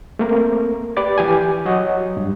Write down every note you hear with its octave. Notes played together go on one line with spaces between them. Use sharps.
A3 A#3 C4 A#4
G4 B4 D5 A6
E3 G4 G#5
F#3 C#5 D#5 F#5
G2